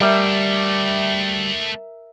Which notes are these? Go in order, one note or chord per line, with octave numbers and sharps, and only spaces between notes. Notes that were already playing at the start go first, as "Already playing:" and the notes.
G3 A3 D4 A#4 E5 F#5